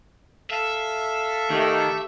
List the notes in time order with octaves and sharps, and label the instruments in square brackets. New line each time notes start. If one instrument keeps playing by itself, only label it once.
[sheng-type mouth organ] A4 F5 [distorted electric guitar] E5
[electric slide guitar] D#3 [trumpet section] A3 G4